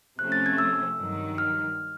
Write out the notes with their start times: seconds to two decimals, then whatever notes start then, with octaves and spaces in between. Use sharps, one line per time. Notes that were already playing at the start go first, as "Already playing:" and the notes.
0.19 C3 F3 A3 C#4 F#6
0.32 A6
0.46 G#6
0.58 E6
0.99 G2 D#3 F#3
1.38 F6